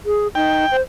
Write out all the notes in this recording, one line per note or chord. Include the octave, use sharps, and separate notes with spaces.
G#4
D#4 G5
C5